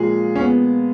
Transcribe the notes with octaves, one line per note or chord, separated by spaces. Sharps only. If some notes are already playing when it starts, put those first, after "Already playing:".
Already playing: A#2 F3 G#3 G#4
C#4
B3